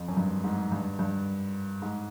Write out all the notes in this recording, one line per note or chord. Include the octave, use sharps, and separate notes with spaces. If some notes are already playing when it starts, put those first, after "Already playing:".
Already playing: F2
F#2
G2
G#2
G2
G2
G#2